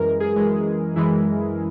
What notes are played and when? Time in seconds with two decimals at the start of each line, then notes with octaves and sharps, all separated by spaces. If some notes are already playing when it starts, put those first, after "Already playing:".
Already playing: F#2 E3 G#3 A#4
0.20 G#4
0.36 F#2 E3 G#3
0.96 F#2 E3 G#3 E4